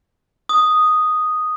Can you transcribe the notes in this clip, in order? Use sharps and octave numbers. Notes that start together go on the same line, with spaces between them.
D#6